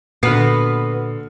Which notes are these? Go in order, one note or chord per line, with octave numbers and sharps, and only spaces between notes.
A#2 D3 B3 F#4 B4 F6 C7